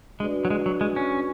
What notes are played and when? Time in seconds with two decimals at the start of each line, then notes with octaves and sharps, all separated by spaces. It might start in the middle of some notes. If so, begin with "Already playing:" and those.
0.20 G#3 D4 F#4 B4 D5
0.45 F#3
0.50 G#3
0.66 F#3
0.81 G#3
0.96 C#4